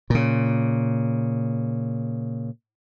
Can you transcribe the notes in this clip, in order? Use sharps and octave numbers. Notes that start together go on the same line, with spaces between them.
A#2 C#3